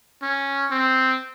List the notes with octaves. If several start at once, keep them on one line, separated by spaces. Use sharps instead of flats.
C#4
C4